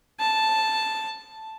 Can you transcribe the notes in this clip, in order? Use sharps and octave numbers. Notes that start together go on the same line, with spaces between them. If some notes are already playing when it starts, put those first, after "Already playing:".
A5